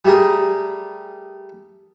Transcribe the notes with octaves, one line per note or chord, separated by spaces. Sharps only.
G3 A3 G4 G#4 A#4